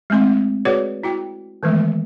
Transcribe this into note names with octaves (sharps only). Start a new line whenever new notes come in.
G#3 A3 C4 C6
F#4 G#4 B4 C#5 D5 F#5
E4 F#4 G5
D#3 E3 G#3 A3 B3